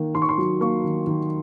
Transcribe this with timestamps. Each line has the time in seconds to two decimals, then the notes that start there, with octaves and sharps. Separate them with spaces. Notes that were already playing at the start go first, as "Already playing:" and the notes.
Already playing: D#3 A#3
0.15 D#3 C6
0.22 C#6
0.29 C6
0.38 F#3
0.61 A#3 C#6
0.84 D#3
1.07 D#3